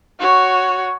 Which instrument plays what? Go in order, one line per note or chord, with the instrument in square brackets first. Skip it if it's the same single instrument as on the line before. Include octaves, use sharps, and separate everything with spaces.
[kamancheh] F#4 C#5